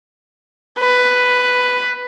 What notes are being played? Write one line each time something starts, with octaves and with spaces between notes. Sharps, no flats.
B4